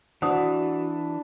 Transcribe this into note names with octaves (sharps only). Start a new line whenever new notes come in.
E3 D4 F#4 C5 F#5 D#6